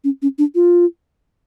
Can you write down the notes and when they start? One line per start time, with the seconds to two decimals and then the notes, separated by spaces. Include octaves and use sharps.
0.04 C#4
0.22 C#4
0.38 D4
0.55 F4